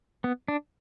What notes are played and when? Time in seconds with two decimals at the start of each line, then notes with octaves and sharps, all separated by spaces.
0.24 B3
0.48 D4